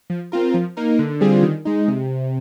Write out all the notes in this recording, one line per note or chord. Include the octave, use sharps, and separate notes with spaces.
F3
C4 F4 A#4
F3
A#3 D#4 A#4
D3
G3 C4 F4 G#4
D#3
G#3 D#4
C3